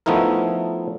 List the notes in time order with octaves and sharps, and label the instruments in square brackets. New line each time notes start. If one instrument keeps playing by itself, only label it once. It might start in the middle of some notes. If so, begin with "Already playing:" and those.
[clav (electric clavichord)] F3 A3 B3 D#4 E4 A#4